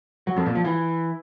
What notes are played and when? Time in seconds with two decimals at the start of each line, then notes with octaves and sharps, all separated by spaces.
0.27 F#3
0.36 F2
0.46 A#2
0.55 F3
0.64 E3